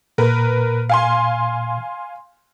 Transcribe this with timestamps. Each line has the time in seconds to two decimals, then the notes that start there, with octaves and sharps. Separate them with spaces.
0.18 A#2 A#4 B4
0.89 F5 G#5 C6